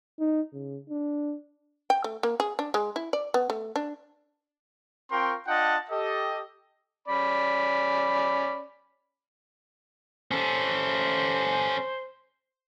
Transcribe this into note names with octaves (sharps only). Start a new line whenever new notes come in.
D#4
C#3
D4
G5
A3
A#3
G#4
D4
G#3
E4
D5
B3
A3
D4
C4 F4 A#4 G5 C6 C#6
D4 F4 D#5 F#5 G5 A5
G4 A4 D#5
C#4 D5 B5
C#4 A4 C5